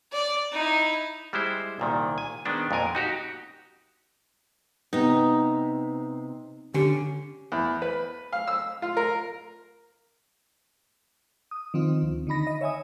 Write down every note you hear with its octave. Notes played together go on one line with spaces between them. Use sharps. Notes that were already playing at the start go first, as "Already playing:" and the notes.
D5
D#4 E4
G3 G#3 E4 C5
C2 A#2 D#3
G#5
D#3 G#3 B3 D4 C5
F2 A#2 A#4 G#5
D#4 F#4 G4
C3 B3 D#4
D3 C#4 G4
E2
B4
F5
E6
F4
A#4
D#6
D#3 F3 C4 F4
D2
D3 D#3 D#4 B5 A#6
D#5
C#5 E5 G#5 D#6